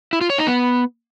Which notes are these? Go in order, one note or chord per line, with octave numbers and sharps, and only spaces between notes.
E4
F4
C#5
D#4
B3